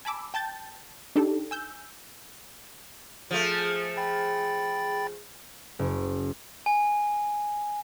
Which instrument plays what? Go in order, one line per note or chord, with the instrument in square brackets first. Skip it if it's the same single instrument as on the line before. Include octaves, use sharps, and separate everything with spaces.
[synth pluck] G#5 A5 B5 D6 E6
G5 A5 G6 A6
D4 D#4 G4 A4
G#5 E6 G6
[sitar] F3 A3 [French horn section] G#4
[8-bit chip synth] G5 B5 A6
[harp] F#1
[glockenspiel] G#5